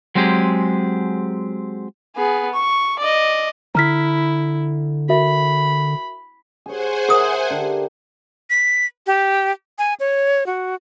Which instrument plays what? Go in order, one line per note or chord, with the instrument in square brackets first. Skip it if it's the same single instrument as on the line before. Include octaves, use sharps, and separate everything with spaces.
[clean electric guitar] F#3 G#3 C4 G4 G#4
[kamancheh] B3 G#4
C#6
D5 D#5
[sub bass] D3 [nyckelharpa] E4 [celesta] A#5 F6 B6
[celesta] F#4 A#4 E5 [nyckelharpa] B5
[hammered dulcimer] G#4 C#5 [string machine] C5 F#5 G#5
[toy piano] G#4 D#6 [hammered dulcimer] A#4 E5
[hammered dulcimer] D3 G4
[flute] B6
G4
G#5
C#5
F#4